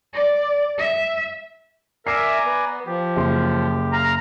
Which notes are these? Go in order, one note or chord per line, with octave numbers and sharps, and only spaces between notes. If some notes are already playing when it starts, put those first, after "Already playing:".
D5
E5
A#4 D5 E5 G#5 A#5 C7
B3
F3 G4
F#1 C6
F5 A#5